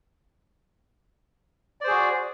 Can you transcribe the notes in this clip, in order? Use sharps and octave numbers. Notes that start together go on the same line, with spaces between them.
F#4 G#4 C5 D5